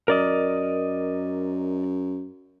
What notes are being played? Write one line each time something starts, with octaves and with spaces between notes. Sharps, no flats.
F#2 A#4 D5 D#5